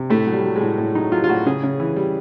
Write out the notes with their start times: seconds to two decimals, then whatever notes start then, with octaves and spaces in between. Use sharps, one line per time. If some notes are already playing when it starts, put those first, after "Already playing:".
Already playing: C3
0.10 A2 A3
0.27 F#3
0.33 G3
0.44 F#3
0.56 G#3
0.61 A2
0.78 A2
0.95 F#3 D#4
1.12 F#3 F4
1.24 F4
1.29 A2 F#4
1.46 C#3 G#4
1.63 C#3
1.80 E3
1.96 G3